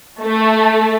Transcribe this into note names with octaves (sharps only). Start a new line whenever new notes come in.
A3